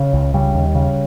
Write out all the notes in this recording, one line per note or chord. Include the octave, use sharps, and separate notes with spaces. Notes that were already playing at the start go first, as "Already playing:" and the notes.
Already playing: C#3
C#2
C#3 G3
D#2
C#3